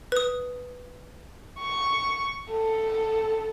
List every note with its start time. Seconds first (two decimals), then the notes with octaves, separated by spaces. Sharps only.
0.12 B4 D#6
1.60 C#6
2.50 A4